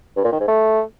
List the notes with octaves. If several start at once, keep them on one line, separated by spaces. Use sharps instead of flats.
G2
A#2
D#3
G#2
A3